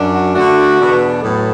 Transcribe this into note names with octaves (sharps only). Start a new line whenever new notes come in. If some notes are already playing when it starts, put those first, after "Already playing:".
Already playing: F#2 F#3 D4
F#4
D3 A3 D4 F#4
E2 B2 B3 D4
A2 F#3 B3 A4